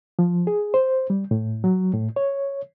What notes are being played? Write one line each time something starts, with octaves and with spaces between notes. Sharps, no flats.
F3
G#4
C5
G3
A2
F#3
A2
C#5